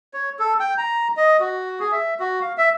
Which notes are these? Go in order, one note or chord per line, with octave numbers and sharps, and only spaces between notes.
C#5
A4
G5
A#5
D#5
F#4
G#4
E5
F#4
F5
E5